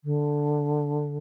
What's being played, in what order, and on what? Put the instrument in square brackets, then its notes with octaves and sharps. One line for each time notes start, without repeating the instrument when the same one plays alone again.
[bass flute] D3